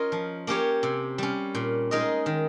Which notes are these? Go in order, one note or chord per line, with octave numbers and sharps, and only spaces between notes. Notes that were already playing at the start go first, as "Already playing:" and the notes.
Already playing: C#4 F4 A#4 D#5
F3
A#3 C#4 G4 C#5
C3
G3 C#4
A#2
G#3 D#4 A#4 D#5
D#3